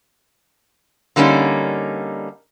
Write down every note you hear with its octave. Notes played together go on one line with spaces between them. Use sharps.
D3 G3 A#3 C#4 D#4